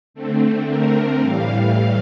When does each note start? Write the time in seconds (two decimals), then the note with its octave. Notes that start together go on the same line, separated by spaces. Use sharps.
0.14 D3 A3 C4
0.68 A#4
1.20 A2 E3 G3 F5